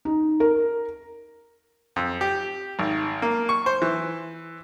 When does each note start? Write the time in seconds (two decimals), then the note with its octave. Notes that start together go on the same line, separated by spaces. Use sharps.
0.05 D#4
0.40 A#4
1.96 F2
2.21 G4
2.79 G#1
3.22 A#3
3.49 C#6
3.66 C5
3.82 E3